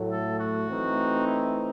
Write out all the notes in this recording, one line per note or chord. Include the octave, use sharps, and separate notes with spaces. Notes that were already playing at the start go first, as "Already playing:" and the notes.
Already playing: A2 F#3 A3
A4
F#4
E3 A3 C4 D#4
E4